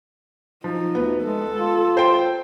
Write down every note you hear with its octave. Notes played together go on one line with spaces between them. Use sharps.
F3 D#4
D2 B3
G#3 A4
F4
C5 G5